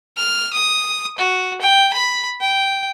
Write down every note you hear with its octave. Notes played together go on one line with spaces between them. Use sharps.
F6
D#6
F#4
G5
B5
G5